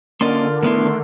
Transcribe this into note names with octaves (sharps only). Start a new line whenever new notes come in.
D3 A#3 C#4 F4 A#4 D5 D#5 C6
A2 D#3 A3 B3 E4 C6